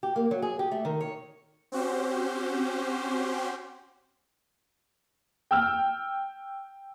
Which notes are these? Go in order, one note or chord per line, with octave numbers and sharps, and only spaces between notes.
G4
A#3
F#3
G#4
G4
A3
D#3
C#5
C4 C#4 F#4 G4 C5
G5 E6 F6